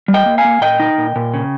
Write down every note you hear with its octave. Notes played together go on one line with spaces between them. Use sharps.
G3
D#5 G5
A#3
F5 G#5
A#3
A#2 D#5 G5
D#4
A#2
A#2
C#3